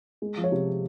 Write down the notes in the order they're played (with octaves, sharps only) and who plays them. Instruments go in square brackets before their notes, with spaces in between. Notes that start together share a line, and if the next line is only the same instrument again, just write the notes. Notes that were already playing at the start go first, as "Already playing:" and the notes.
[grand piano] G#3
F3
C#5
C3